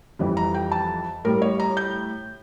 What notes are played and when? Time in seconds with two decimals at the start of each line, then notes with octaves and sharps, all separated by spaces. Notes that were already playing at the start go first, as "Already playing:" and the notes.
0.19 F2 E3 G3
0.37 A#5
0.54 G5
0.72 A5
1.24 A2 G3 A#4
1.42 C#5
1.60 A#5
1.77 G6